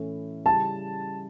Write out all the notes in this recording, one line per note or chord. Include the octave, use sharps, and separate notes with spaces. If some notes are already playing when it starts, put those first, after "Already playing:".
Already playing: A2 E3 A3 C#4
C#3 G3 C#4 E4 G4 A5